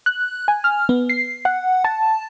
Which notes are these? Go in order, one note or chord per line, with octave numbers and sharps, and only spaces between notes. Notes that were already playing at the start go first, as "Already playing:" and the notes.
F#6
G#5
F6
B3
C7
F#5
A5